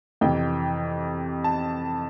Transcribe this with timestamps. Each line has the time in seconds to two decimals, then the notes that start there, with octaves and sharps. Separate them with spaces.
0.21 F2 C3 E3 G5
1.44 A5